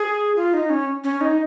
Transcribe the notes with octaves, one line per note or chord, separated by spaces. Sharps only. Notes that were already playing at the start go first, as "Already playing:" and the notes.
Already playing: G#4
F4
D#4
C#4
C#4
D#4